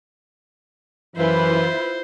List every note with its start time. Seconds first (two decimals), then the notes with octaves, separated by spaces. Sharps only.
1.16 F#2 E3 E4 F4 B4 C5